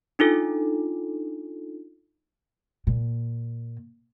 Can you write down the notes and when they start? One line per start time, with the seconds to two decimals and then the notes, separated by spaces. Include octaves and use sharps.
0.19 D4 D#4 F4 A4
2.87 A#2